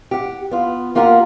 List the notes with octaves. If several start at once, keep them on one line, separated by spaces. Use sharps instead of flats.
G4 F#5
B3 F4
A#3 F4 G4 A#4 F#5